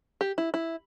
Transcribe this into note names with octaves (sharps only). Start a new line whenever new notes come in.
G4
E4
E4